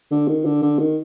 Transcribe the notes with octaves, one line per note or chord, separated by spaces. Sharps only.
D3
D#3
D3
D3
D#3